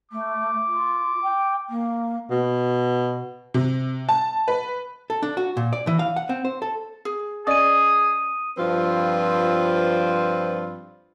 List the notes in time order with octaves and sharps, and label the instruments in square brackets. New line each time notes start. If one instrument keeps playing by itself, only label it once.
[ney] A3 [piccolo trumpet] D6
[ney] F4
G5
A#3
[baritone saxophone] B2
[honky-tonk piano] C3
A5
B4
[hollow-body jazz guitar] A4
D4
F#4
A#2
D5
E3
F5
F#5
C4
C5
A4
[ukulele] G#4
[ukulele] C#4 D5 D#5 [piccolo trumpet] G#4 [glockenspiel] D#6 D#7
[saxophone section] G2 F3 C4 F4 B4